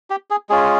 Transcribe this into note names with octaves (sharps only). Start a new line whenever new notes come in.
G4
G#4
G#3 C#4 F4 G#4